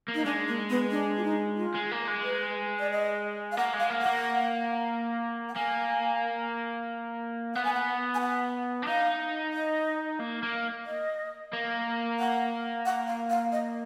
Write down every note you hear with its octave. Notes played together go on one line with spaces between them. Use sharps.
A#3
D#4
G#3 D4
A#3
B3
D4
F4
D#4
F4
G#3
A#3
G#3
B4
D5
D#5
F5
A#3 F#5
G#3
F5
A#3
A#3 F#5
F#5
A#3 G#5
B3 F#5
G#5
F#5
G#5
F#5
D4
D#4 F5
D#5
A#3
A#3
D#5
A#3
F#5
F#5
F5
F5
D#5